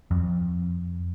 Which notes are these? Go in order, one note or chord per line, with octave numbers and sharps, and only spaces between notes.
F2